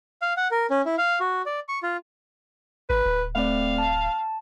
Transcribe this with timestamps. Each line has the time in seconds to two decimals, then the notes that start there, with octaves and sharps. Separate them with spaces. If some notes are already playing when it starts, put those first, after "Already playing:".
0.22 F5
0.37 F#5
0.51 A#4
0.70 C#4
0.85 E4
0.98 F5
1.20 F#4
1.46 D5
1.69 C#6
1.83 F4
2.90 G#1 B4
3.06 D1
3.35 A3 C4 D5 F5
3.78 A5